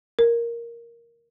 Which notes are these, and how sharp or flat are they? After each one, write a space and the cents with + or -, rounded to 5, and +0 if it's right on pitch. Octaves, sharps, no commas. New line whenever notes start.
A#4 +5